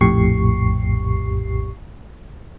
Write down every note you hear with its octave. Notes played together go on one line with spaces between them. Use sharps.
A#1 F2 A2 G4 C#6 C7